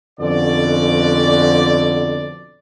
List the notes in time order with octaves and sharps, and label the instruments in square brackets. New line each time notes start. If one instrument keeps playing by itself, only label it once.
[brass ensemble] F2 B2 D3 C#4 D5